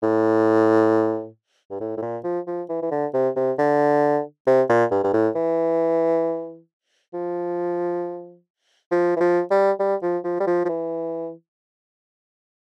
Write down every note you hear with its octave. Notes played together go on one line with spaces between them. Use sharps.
A2
G2
A2
A2
A#2
F3
F3
E3
E3
D3
C3
C3
D3
C3
A#2
G2
G2
A2
E3
F3
F3
E3
F3
G3
G3
F3
F3
G3
F3
F3
E3